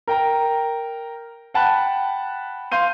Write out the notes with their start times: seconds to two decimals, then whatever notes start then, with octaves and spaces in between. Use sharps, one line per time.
0.08 A#4 G5 A#5
1.54 F#5 G5 A5 B5 F#6
2.72 F5 C6 G6 D#7